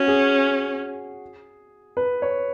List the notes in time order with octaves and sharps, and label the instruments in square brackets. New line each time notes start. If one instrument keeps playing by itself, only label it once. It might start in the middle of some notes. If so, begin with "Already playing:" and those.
Already playing: [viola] C#4 [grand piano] F#4
[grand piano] G#4
B4
C#5